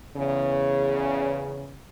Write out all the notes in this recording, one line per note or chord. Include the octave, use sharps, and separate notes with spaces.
E2 C#3